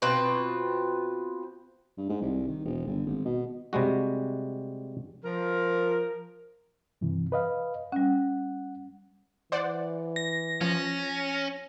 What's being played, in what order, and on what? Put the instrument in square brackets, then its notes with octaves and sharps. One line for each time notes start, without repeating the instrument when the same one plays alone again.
[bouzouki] B2 C4 F4 B4
[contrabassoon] G2
G#2
C2
D#3
E1
G1
G#1
B2
[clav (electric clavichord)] C3 G3 G#3 F#4
[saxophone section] F3 A#4
[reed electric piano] G2 C3 E3
B4 D#5 F5
[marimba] G3 C#4 [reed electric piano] F#5
[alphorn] E3 [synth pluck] C5 D5 F#5
[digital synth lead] A#6
[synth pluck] F3 A6 [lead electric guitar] C#4